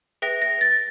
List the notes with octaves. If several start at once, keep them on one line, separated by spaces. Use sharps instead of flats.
G#4 B4 E5 G5 A#6
A#6
A6